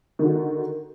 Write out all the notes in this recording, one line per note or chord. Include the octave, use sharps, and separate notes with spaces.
D3 D#3 F#4